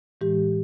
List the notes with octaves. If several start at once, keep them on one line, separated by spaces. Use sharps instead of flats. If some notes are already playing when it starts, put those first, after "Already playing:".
A2 E3 G#3 G4